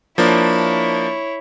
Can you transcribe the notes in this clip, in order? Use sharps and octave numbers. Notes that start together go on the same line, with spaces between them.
F3 A#3 D4 E4 C#5